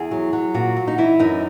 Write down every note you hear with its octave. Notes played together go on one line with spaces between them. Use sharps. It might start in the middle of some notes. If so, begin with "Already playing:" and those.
Already playing: E2 G#4
F#3
F#3
A#2 F#4
F#3
D#4
E3 E4
F#2 D#4